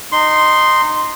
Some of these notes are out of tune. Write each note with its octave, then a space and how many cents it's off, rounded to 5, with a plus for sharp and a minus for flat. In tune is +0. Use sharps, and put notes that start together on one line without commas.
D#4 -15 C6 +0